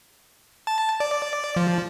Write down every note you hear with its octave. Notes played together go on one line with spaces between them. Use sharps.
A5
D5
F3